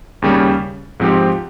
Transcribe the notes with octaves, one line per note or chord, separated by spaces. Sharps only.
D#2 C#3 G3 C#4
G#2 F3 C4 G4